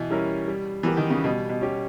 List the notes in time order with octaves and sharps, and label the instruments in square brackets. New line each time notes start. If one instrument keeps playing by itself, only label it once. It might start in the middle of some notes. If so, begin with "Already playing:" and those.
Already playing: [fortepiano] B2 [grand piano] E3
[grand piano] G3 C#4 E4 A#4
G3
[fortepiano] E3 [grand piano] B3 G4 A#4
[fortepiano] D#3
C#3
[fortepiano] B2 [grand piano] G3
[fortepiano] B2
[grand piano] C#4 G4